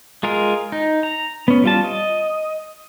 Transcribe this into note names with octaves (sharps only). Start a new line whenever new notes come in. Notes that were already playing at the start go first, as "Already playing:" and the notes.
G#3 F4 G#4 A#4
D#4
A#5
B3 C#4
G3 F4 A5
D#5